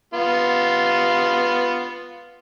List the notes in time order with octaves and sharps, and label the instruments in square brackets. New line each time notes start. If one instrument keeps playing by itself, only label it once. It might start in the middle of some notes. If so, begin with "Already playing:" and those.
[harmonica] B3 F4